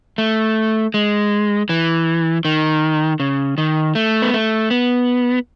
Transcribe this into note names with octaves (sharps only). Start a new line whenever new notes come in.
A3
G#3
E3
D#3
C#3
D#3
A3
B3
A3
B3